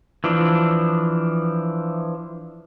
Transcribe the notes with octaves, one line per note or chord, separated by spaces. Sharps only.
E3 F3 D4